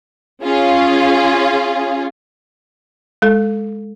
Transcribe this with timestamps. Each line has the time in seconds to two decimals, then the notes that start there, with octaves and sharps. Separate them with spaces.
0.42 C#4 F4 G#4
3.22 G#3 A4